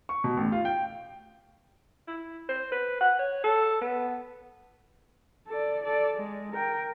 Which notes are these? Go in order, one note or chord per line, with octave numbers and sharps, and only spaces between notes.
C#6
B2
A1
F4
G5
E4
C5
B4
F#5
C#5
A4
B3
A4 D5
A4 D5
G#3
A#4 G5